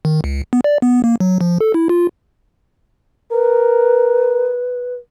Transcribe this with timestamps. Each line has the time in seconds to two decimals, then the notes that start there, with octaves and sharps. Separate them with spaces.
0.05 D#3
0.24 C#2
0.53 B3
0.64 D5
0.82 B3
1.04 A#3
1.20 F#3
1.41 F3
1.61 A4
1.74 E4
1.89 F4
3.32 A#4 B4